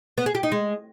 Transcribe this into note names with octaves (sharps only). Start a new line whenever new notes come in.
B3
G#4
G4
D#4
G#3